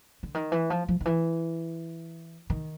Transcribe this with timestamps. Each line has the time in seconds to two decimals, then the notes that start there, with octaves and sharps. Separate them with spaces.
0.23 D3
0.34 D#3
0.52 E3
0.70 F3
0.88 F3
1.00 D#3
1.05 E3
2.50 D#3